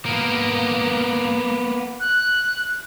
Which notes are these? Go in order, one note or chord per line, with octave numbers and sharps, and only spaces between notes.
A#3 B3
F#6